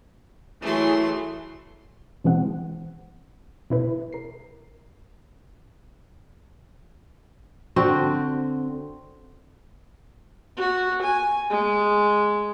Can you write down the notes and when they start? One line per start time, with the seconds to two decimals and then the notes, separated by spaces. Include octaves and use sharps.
0.62 E3 F#3 A3 E4 G#4 C6
2.24 B2 E3 G#3 C4 F#5
3.70 B2 E4 B4
4.13 A#4 C7
7.76 D3 C4 F#4
10.57 F#4
11.03 G#5
11.50 G#3